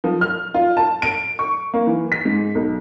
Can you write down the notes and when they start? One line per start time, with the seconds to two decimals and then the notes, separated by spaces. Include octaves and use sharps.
0.04 F3
0.21 F6
0.54 F4
0.77 A5
1.02 D7
1.39 C#6
1.74 A#3
1.87 E3
2.12 B6
2.25 G#2
2.55 B1